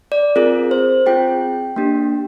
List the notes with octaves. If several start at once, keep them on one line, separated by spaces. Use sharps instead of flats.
D5
C4 F4 G#4 A#4
C5
C4 F4 G#4 G5
A#3 D4 G4